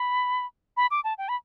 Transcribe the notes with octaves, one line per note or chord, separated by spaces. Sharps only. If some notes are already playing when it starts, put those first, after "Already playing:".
Already playing: B5
B5
D6
A5
G5
B5